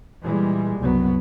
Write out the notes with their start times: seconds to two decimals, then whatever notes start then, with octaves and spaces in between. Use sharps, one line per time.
0.23 A#2 E3 G3 G#3
0.78 F#1 C2 F#3 B3